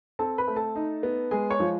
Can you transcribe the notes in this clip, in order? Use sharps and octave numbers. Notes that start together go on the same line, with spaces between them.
C4 A4 A5
B4 B5
A3
A4 A5
D#4
B3
G#3 G#4 G#5
C#5 C#6
F3